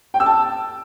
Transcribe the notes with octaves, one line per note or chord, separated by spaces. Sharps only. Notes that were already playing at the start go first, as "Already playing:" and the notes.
G5
E6
A5